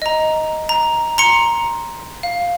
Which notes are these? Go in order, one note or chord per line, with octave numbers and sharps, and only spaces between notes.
D#5 A#5
A#5
A#5 C6 C#7
F5